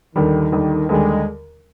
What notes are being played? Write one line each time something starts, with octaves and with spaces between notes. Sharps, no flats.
D#2 D3 D#3 G3
D#2 D3 G3
D#2 D3 G3 G#3